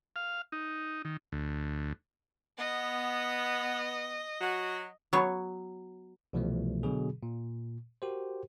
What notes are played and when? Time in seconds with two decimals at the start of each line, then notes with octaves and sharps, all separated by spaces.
0.16 F5
0.52 D#4
1.05 D#3
1.32 D2
2.58 B3 D#5
4.41 F#3 F#4
5.13 F#3 B3 C#5
6.33 C2 B2 E3 F3 G3 A3
6.83 B2 D3 F#3 G#4
7.23 A#2
8.02 F#4 G4 A#4 C5